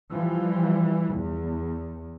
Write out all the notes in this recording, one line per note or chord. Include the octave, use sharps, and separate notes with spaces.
E3 F3 G3
E2